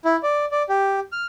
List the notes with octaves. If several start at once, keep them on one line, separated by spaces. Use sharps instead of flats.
E4
D5
D5
G4
F6